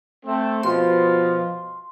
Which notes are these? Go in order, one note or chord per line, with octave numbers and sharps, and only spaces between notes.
A3 C4
B2 F3 F4 C6